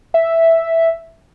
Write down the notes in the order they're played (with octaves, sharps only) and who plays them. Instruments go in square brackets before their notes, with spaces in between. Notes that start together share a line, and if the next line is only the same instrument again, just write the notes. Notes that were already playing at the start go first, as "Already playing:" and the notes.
[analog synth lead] E5